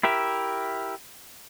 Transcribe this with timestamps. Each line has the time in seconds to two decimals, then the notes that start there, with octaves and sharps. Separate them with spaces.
0.03 E4 G4 A#4 E5